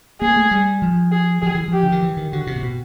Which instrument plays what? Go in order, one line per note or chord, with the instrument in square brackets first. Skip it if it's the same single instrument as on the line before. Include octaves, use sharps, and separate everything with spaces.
[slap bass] A#3 [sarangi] G#4
[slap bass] A3
G3
F3
[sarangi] G#4
[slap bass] F3 [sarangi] G#4
[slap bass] E3
[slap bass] F3 [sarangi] G4
[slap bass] D3
D#3
E3
D#3
[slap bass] D3 [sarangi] F#4
[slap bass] C3
A#2
B2